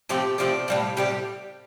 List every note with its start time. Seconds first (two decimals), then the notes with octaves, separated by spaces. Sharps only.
0.09 A2 F3 A3 C4 G4
0.38 A2 F3 A3 C4 D4
0.68 A2 G3 C4 F4
0.97 A2 G3 C4 G4